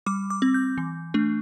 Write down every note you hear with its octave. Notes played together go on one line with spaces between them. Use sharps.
G3 D6
D6
C4
G6
E3
A3 D4